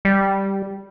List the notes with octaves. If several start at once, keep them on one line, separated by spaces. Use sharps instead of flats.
G3